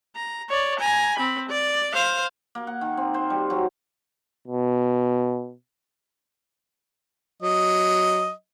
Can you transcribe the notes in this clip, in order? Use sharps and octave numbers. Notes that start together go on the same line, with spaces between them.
A#5
C#5 D5
G#5 A#5
C4 B5
D5
C5 F5
A#3
F#5
D#3
C4
C5
G3
F#3
B2
F#3 D#5